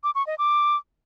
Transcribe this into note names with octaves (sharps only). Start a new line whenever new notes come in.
D6
C#6
D#5
D6